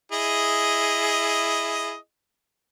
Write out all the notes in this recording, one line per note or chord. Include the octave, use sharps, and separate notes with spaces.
E4 G#4 D#5